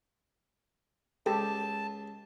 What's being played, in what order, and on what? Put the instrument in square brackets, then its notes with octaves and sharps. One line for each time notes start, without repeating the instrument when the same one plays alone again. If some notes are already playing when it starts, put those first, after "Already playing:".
[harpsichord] C#2 [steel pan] G4 A4 [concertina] A5